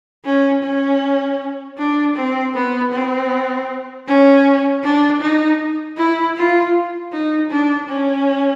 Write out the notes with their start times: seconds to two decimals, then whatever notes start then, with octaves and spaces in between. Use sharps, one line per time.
0.25 C#4
0.63 C#4
1.78 D4
2.15 C4
2.54 B3
2.92 C4
4.07 C#4
4.83 D4
5.21 D#4
5.97 E4
6.36 F4
7.12 D#4
7.50 D4
7.88 C#4